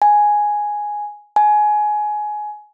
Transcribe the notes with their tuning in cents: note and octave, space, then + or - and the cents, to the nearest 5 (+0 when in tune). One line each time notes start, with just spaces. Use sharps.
G#5 +0
G#5 +20